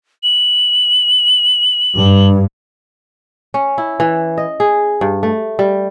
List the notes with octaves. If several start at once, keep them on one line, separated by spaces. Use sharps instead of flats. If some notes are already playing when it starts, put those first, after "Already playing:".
F#7
G2
C#4
E4
E3
D#5
G#4
G2
A3
G3